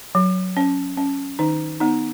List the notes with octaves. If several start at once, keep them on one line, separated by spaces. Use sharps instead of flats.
F#3
C#4
C#4
D#3 D#4
B3 D#4